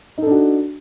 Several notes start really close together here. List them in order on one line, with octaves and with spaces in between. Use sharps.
D#4 A4 D4 F#4